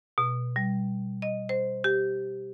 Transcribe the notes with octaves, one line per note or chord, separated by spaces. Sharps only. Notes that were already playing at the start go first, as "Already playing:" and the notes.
B2
G3
D#5
C5
G4